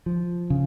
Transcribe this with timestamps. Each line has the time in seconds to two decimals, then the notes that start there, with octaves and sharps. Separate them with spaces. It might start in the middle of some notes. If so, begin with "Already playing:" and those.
0.06 F3
0.50 C#3